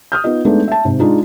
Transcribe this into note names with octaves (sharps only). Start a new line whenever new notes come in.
D#6 F6 G6
B3 D#4 F4 D#5
G#3 A3 B3 D4 D#4 A4
E5 A5
G#2 C3
G#3 D4 D#4 F4